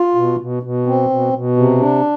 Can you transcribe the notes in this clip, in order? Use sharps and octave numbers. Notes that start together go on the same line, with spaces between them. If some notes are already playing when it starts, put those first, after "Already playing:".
Already playing: F4
B2
B2
B2
C4
B2
B2
C3
D4